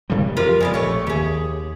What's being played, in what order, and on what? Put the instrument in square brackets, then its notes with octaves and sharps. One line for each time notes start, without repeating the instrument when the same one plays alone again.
[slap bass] C3 E3 G3
[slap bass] F2 [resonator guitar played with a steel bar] F4 G4 A#4
[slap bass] F2 [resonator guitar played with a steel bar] G#3 B3 D5
[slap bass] A#1 [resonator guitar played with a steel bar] A3 C#5
[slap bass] D#2 [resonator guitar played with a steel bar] G4 G#4